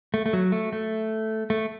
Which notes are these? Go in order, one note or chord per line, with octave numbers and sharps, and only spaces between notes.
A3
A3
F#3
A3
A3
A3